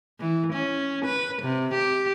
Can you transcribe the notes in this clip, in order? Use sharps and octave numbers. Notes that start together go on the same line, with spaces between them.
E3
C#4
B4
C3
G4